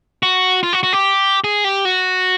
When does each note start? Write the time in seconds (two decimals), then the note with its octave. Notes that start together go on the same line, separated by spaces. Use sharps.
0.23 F#4
0.63 F4
0.73 F#4
0.83 F#4
0.93 G4
1.44 G#4
1.64 G4
1.85 F#4